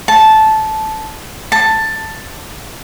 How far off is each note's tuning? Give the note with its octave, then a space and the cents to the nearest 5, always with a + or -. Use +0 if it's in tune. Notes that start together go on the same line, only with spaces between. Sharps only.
A5 -15
A5 +10